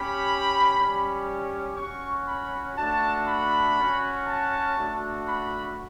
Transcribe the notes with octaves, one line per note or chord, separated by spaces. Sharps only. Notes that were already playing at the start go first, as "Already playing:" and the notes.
Already playing: C#4 G4 B5
G3 C#4 G4
C#4 F#4 C#6
B5
A3 D4 F#4 A5
B5
C#4 F#4
A5
A3 D4 F#4
B5